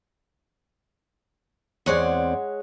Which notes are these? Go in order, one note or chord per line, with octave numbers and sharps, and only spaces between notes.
E2 G#3 C4 C#5 D5 F#5